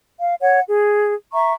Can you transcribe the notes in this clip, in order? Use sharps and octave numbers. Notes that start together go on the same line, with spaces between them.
F5
C#5 F#5
G#4
E5 A#5 C#6